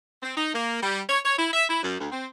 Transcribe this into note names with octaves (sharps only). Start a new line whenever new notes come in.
C4
D#4
A#3
G3
C#5
C#5
E4
E5
E4
F#2
D2
C4